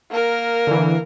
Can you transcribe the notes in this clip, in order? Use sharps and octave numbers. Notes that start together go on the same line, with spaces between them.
A#3 A#4
D3 E3